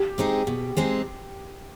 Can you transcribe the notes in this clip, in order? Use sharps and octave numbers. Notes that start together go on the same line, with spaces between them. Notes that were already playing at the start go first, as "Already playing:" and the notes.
Already playing: G4
G#3 C4 D#4 G#4
B2
G#3 C4 D#4 G#4